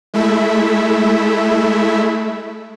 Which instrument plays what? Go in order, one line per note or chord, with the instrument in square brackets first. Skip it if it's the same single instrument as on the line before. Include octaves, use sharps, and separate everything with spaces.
[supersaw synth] G#3 A3 E4 E5